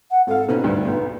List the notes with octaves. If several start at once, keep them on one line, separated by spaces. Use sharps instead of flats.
F#5
G#1 A4 F5
B2 C4 C#4 D#4
D2 G2
B1 B3